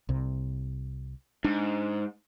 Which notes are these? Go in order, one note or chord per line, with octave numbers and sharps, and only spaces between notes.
C2 C3
G#2 D4